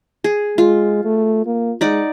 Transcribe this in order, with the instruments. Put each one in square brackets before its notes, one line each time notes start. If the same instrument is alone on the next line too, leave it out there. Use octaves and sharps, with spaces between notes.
[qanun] G#4
[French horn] G#3 [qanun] F4
[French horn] A3
A#3
[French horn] G#3 [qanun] D#4 D5 F#5